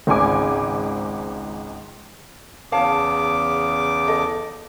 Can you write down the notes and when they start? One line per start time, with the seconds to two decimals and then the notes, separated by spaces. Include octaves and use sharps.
0.07 G#1 C#2 G#2 G#5 D6
2.72 E2 C#3 C#5 F5 A5 D6
4.08 A4 D#5